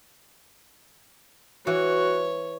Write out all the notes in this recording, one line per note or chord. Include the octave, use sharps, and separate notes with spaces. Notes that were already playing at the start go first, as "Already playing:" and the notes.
E3 F#4 C#5